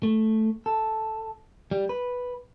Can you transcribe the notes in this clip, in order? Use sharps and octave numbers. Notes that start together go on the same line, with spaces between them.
A3
A4
G3
B4